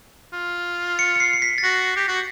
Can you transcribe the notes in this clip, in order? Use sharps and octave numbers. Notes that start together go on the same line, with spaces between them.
F4
C#7
C#7
C7
C7
B6
A6
F#4 A#6
G4
F#4